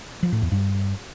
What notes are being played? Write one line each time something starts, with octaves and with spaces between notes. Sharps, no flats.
F3
A2
E2
G2